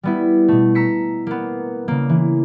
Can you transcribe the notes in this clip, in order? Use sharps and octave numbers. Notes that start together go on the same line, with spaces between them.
G3 B3 E4
B2 A3
A#5 E6 B6 C#7
A#3 B3
C#3 A#3
E3